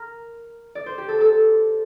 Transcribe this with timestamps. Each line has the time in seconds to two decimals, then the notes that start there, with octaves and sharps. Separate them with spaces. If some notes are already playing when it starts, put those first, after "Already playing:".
Already playing: A#4
0.75 D5
0.86 C5
0.98 G4
1.08 A4
1.20 A4